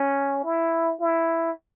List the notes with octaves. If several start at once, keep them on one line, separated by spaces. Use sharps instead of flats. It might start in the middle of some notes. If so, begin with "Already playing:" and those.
Already playing: C#4
E4
E4